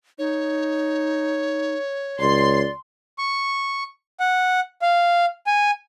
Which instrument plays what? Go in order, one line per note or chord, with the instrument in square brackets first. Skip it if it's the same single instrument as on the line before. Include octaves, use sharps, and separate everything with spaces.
[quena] D#4 [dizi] C#5
[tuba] C#2 [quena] D5 [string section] C6
[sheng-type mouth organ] C#6
F#5
F5
G#5